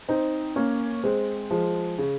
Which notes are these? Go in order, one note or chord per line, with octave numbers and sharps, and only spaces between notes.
C4 D#4
A#3 C#4
G#3 C4
F3 G#3
C#3